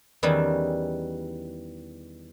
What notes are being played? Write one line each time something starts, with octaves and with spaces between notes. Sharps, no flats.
E2 D#3 E3 G3 C#4